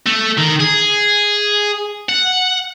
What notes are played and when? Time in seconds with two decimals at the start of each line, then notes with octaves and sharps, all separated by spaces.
0.06 A3
0.38 D#3
0.61 G#4
2.09 F#5